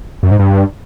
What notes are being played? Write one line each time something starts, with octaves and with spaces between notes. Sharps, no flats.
F#2
G#2
G2